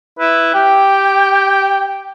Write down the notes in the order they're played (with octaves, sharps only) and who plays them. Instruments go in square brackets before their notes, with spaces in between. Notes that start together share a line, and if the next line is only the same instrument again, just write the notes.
[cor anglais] E4 [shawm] B4
[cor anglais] G4 [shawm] G5